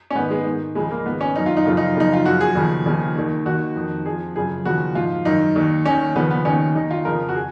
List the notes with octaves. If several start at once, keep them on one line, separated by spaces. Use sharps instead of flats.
C#4
G#2 D#3 B3
G#3
G#2 D#3
C#2 C#3 F3 G#3
A#3
G#2 D#3 B3
C#4
F#2 D#3 D#4
F4
D#4
F#2 C#3 F3 F4
D#4
F#2 C#3 F3 D#4
F4
F#2 F3 F#4
G#4
D#2 C#3 F3
D#2 C#3 F3
D#2 D#3
D#2 D#3 F#4
F2 D#3
F2 F3 G#4
F#2 C#3 F3 G#4
D#2 C#3 F3 F#4
G#2 F3 F4
F#2 D#3 D#4
D#2 D#3
D#2 D#3 C#4
D#2 C#3 F3 B3
B3
D#2 D#3 C#4
D#2 D#3 D#4
F4
F2 C#3 F3 A#4
F#4
G#4